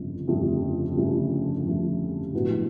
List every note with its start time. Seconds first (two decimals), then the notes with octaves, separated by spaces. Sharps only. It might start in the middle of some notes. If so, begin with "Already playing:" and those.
Already playing: G1 F2 C#3 F3 A3
0.28 G1 F2 C#3 F3 A3
0.96 G1 F2 C#3 F3 A3
1.64 G1 F2 C#3 F3 A3
2.33 A#1 A2 F#3 B3